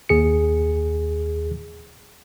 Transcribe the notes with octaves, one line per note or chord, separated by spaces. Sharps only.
D#2 G#4 C#7